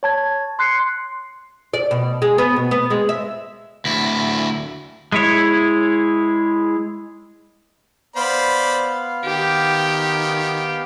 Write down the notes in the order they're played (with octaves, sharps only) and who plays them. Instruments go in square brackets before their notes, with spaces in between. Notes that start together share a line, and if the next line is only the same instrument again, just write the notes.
[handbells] C#5 A5 G#6
C6 F#6 C7 C#7
[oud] D5
B2
G#3
B3
B2
B3
G#3
E5
[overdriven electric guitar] D2 E4
[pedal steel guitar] G#3 E4 C#5
[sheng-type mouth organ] B3 F5 [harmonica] C5 D5 B5
[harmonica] D#3 [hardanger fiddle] G4